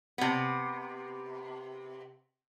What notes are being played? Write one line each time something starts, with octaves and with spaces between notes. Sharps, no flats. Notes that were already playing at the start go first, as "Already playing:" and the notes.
C3 B3